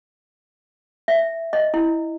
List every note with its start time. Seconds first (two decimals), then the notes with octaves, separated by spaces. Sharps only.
1.08 E5
1.53 D#5
1.74 E4